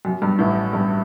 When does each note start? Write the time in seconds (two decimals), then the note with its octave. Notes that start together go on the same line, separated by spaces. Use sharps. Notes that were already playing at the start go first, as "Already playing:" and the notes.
0.05 F#2
0.22 G2
0.39 A1 A2
0.73 G2